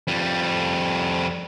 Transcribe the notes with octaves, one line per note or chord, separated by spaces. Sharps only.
F2 G3